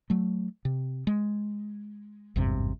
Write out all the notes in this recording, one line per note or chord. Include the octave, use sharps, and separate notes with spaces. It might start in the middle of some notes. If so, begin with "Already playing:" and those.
F#3 A3
C3
G#3
G#1 E2 G2 C3